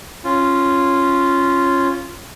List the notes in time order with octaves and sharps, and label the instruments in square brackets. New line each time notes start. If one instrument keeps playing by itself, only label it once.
[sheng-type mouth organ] C#4 F4